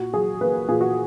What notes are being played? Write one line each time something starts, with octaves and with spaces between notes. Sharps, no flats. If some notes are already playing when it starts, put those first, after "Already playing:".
Already playing: A#2 F#4
F#3 G#4
A#3 B4
A#2 G#4
F#4